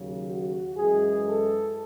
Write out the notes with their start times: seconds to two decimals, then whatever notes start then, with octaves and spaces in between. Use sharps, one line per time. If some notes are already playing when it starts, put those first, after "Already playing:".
Already playing: D#2 C#3 F#3
0.25 F#4
0.75 F#2 E3 G#3 G#4
1.26 A4